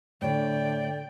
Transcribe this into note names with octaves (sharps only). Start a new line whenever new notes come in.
A2 D3 C#5 D5 G5